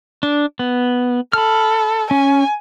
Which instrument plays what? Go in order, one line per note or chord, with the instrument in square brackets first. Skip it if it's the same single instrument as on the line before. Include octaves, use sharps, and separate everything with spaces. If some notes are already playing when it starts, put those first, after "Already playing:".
[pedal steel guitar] D4
B3
[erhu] A4 [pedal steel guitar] B5 F6
[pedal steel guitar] C#4 [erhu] G#5